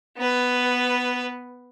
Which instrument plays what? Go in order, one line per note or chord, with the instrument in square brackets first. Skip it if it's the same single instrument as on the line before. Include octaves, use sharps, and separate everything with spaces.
[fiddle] B3 B4